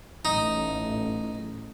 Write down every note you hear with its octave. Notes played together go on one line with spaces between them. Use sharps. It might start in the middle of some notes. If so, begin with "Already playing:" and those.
A1 D#4